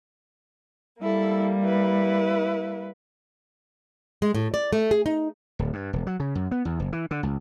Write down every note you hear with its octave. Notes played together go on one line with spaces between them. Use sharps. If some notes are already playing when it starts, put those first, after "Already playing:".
G3 A#3 E4 A4
E4 B4
G#3
A2
D5
A3
G#4
D#4
D1
G2
E1
F#3
C#3
F#2
B3
E2
F#1
E3
D3
C#2